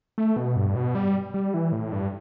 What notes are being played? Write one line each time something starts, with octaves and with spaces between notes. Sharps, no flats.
A3
B2
G2
B2
G3
G3
E3
A2
G2